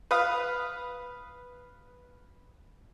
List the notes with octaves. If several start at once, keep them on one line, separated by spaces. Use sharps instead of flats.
B4 F5 D#6